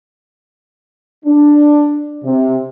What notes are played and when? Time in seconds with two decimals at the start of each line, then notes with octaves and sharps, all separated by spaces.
1.25 D4
2.24 C3